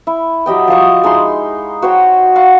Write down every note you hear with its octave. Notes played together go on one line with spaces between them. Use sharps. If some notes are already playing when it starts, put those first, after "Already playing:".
E4
F#3 G4 D#5 G5
F3 F4 D#5 C#6
G#3 D#4 E4 C6
F#4 C5 C#5 G5
F5 F#5 C6 C#6